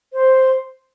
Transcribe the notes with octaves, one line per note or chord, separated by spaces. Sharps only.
C5